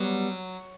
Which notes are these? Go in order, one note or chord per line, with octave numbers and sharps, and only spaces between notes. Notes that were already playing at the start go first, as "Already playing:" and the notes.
Already playing: F#3 G3 B3